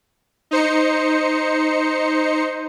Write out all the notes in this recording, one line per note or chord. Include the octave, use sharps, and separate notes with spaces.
D#4 C5 C#7